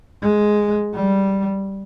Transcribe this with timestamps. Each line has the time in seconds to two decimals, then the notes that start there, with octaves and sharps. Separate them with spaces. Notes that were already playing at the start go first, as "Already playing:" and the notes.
0.22 G#3
0.94 G3